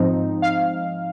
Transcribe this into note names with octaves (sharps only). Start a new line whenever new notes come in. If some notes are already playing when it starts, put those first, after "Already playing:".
Already playing: G#2 F3 C4 D#4
F5